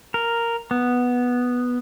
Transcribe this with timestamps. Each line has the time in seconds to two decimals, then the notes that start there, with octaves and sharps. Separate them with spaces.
0.14 A#4
0.71 B3